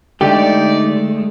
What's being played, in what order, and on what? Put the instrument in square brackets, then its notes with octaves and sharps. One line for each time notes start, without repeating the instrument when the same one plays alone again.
[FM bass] D3 [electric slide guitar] G#3 A3 [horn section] D#4 D5 [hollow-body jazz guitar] G4